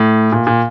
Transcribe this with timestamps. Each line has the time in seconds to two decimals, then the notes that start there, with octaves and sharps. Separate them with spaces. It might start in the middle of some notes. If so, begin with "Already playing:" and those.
Already playing: A2
0.32 A#2
0.47 A#2